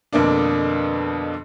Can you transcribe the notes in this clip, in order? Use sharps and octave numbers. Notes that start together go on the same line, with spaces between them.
F2 B2 D3 A#3 D4